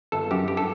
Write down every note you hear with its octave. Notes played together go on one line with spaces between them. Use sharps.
G1 A4
F#2 G4
G2 G4
A4